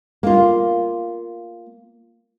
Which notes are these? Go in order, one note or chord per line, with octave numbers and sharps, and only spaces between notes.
A#3 F4